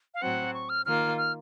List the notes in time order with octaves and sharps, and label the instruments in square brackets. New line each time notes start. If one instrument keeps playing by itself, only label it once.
[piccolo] F5
[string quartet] A2 F#3 C4 [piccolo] F#5
[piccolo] C#6
F6
[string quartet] D#3 A#3 F4 [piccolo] F6
[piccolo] F6